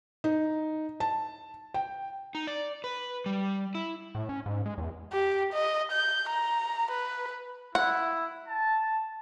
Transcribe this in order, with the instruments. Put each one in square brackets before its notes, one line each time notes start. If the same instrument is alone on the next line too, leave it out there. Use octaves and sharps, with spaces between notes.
[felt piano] D#4
A5
G5
[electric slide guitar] D#4
D5
B4
G3
E4
[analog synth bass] A2
C#4
G#2
G#3
E2
[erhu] G4
D#5
G6
A#5
B4
[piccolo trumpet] E4 [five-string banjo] F#5
[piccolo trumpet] A5